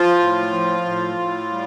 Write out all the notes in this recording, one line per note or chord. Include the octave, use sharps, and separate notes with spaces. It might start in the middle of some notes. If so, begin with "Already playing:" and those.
Already playing: F3 F4
A2
F3
A2
A2
G3